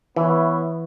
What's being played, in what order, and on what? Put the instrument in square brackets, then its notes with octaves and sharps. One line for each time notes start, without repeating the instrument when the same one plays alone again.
[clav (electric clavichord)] E3 [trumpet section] B3 E4 C#5 E5